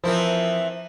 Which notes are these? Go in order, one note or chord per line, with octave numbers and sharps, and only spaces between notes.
E3 F3 C4 E4 A#4